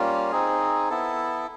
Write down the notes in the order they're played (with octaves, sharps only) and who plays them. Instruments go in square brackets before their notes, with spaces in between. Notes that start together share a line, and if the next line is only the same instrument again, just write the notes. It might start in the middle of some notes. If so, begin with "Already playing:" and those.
Already playing: [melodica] G3 A#3 C#4 F4
C4 D#4 G#4
B3 E4 A4